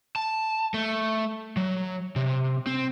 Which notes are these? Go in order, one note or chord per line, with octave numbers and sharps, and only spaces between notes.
A5
A3
F#3
C3
C4